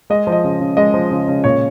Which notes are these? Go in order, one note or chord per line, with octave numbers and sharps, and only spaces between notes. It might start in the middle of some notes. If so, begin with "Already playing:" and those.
G#3 D#5
F3
D#5
C#3
C#3
G#3 D#5
F3
C#3
C#3
A#2 C#5